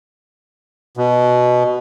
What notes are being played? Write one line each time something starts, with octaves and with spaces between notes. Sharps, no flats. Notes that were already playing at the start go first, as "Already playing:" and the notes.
B2